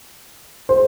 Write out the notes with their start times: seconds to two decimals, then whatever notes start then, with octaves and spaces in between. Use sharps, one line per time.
0.69 C5